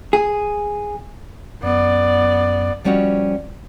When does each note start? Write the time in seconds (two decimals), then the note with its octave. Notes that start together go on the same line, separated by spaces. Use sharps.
0.13 G#4
1.63 F#2 B3 D5
2.84 F3 G3 C#4 F#4 G4 D#5